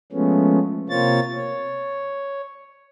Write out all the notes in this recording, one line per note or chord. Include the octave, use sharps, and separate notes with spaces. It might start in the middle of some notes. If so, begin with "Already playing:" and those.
F3 G#3 A3 B3 C#4
C3 A#3 C4 F4 C#5 A6
C#5